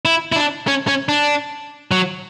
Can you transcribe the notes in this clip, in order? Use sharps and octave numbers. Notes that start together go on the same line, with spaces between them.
E4
E4
D4
C#4
C#4
D4
F#3